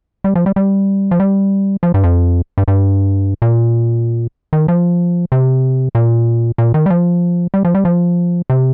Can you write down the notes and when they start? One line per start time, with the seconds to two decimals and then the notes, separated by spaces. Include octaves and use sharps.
0.24 G3
0.35 F3
0.46 G3
0.56 G3
1.11 F3
1.20 G3
1.83 F3
1.94 G2
2.04 F2
2.58 G2
2.68 G2
3.42 A#2
4.53 D#3
4.68 F3
5.32 C3
5.95 A#2
6.58 A#2
6.74 D#3
6.86 G3
6.90 F3
7.54 G3
7.65 F3
7.75 G3
7.85 F3
8.50 C3